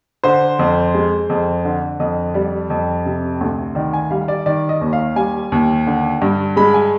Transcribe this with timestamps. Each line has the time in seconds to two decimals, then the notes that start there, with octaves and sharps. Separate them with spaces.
0.24 D3 C5
0.59 F2
0.95 G#3
1.29 F2
1.65 D3
2.00 F2 D#5
2.34 G3 D5
2.70 F2
3.06 C3
3.41 D2
3.75 D#3 D5
3.93 G#5
4.11 G3 F5
4.28 D5
4.46 D#3 D5
4.69 D#5
4.81 D#2
4.93 F5
5.16 G3 G#5
5.52 D#2
5.87 D3
6.22 G2
6.56 G#3 B5
6.74 G#5